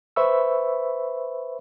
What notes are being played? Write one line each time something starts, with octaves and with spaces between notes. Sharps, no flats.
B4 C5 E5 B5 C#6 E6